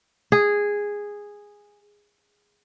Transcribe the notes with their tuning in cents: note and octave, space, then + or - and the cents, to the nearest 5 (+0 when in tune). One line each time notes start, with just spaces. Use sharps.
G#4 -10